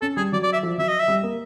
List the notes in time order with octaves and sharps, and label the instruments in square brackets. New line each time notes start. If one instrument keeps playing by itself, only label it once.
[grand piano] C#4 [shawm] A4
[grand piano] G3 [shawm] G#4
[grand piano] F#3 [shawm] D5
[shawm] D5
E5
[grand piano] F3
[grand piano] F#3 [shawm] E5
[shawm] D#5
E5
[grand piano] G3
A#3